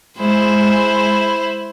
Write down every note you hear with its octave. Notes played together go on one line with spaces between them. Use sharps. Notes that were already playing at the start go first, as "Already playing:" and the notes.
G#3 E4 C5